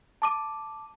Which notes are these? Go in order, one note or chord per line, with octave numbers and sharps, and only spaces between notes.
A5 D6 D#7